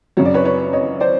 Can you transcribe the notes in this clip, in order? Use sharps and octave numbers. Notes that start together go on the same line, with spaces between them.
F#2 C#3 F#3 C#5
D5
B4 C#5
B4 C#5
C#5 D#5
C5 D5